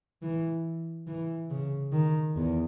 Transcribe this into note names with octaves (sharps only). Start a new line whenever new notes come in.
E3
E3
C#3
D#3
E2